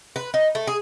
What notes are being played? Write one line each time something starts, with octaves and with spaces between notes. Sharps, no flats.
B4
D#4
A3
G#4